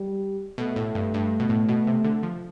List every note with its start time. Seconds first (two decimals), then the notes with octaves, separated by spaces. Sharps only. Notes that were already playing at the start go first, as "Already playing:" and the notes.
Already playing: G3
0.58 B2 A3
0.76 A2
0.95 G2
1.14 G2
1.40 B2
1.49 A2
1.69 B2
1.87 C3
2.04 D3
2.23 F3